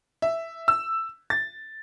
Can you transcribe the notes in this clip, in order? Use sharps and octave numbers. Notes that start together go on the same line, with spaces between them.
E5
E6
A6